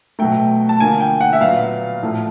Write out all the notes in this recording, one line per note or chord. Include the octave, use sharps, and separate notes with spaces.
B2 F#3 A3 G5
A5
D3 F3 A#3 G#5
G5
F#5
E5
A#2 F#3 B3 F5
A2 F3 A3